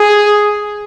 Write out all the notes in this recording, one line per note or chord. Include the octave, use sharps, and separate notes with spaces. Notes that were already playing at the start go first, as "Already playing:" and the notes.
Already playing: G#4